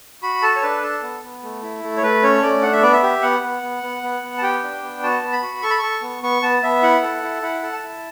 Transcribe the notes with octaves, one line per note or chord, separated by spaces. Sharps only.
F#4 B5
A4 A5
C#5
D4 B4
A4
B3
B3
A3
E4
A3
C#5
A3 B4
C#4 C#5
A3 D5
D4 F#5
E5
B3 D5
E5
G4
B3 F#5
B3
B3
B3
B3
B3
A5
G4 G5
D4
B3
F#4 A5
B3
B5
F#4
A4 C#6
B5
A4 C#6
B3
B3 C#6
B3 A5
B3 E5
E4 F#5
A4
E4
E4 F#5
A4
A5
E4